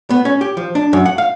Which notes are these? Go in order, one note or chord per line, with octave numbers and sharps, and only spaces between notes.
B3
C#4
G4
F3
D4
F#2
F#5
F5